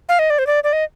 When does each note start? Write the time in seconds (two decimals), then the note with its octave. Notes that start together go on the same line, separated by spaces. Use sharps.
0.09 F5
0.19 D#5
0.30 D5
0.39 C5
0.47 D5
0.64 D5
0.73 D#5